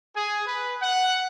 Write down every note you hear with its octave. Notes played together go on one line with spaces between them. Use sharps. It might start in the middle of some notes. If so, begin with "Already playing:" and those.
G#4
B4
F#5